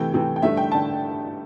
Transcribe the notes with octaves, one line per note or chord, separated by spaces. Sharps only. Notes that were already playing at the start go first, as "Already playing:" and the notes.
Already playing: C3 E3 A3 G5
C3 E3 A3
G5
G2 D3 A3 E5
G5
D3 A5